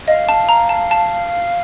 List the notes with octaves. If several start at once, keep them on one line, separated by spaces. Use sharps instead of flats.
D#5 F5
A5
A#5
A5
A5